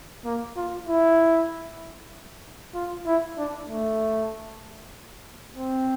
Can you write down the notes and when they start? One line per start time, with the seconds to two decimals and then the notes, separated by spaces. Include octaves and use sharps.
0.25 A#3
0.56 F4
0.88 E4
2.75 F4
3.07 E4
3.38 D4
3.69 A3
5.56 C4